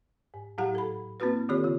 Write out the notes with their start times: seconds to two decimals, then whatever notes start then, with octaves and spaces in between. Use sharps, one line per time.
0.34 G#2
0.58 A2 F#3 E4 G4 F#5 A#5
0.75 A4 B5
1.20 A#3 C4 E4 F#4 B4
1.49 D#3 C4 F4 G4 A4 C#5
1.64 C#3 F4